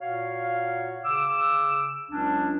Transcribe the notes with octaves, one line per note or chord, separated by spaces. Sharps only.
A#2 F#4 C#5 F5
C#3 D6 E6
C#2 F#3 C#4 D4